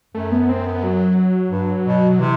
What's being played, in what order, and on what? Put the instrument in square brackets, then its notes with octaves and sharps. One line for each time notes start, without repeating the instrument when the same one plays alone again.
[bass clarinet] F#2 [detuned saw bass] A3
[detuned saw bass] B3
C4
B3
F#3
[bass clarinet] G2
B2
[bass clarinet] C3 [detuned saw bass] E3